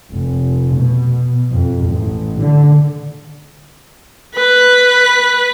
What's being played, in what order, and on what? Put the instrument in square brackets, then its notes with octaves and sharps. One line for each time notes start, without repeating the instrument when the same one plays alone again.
[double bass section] F1
B2
F2
A1
D3
[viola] B4